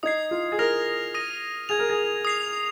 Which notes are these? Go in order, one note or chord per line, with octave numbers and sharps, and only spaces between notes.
D#4 D#6 G#6 C7
F4
G#4
A#4 F6 A#6 F7
D#6 A#6 D#7
G#4 G#6 F7
A#4
G#4
D#6 C7 F7